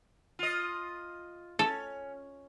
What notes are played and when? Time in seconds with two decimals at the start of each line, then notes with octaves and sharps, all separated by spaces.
0.39 F4 D#5
1.59 C#4 A4